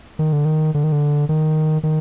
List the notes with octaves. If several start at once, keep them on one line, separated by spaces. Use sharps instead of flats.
D#3
D3
D#3
D3
D#3
D3
D#3
D#3